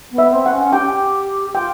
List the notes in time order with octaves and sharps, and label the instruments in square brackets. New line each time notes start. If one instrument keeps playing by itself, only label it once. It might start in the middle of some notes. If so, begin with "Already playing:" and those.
[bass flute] B3
[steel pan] E5
[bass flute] C4
[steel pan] F#5
[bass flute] C#4
[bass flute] G4 [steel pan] G5
[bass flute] F4 [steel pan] G5